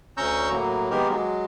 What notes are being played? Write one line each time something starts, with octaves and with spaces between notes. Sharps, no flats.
D2 C#4 A#5 C#6 E6 G6
A2 F#3 A#3
D#3 G#3 A#3 B3 G4 A#4
F#3 G#3